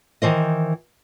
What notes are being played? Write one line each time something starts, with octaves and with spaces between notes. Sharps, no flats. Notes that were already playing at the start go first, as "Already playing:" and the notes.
D#3 E3 C5 D#5